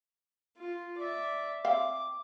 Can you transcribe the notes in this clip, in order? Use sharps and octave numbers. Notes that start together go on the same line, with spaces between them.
F4
D5 E5
C4 E5 F5 D6